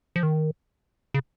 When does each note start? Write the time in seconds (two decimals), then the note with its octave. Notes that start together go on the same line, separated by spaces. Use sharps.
0.16 F3
0.23 D#3
1.14 C#3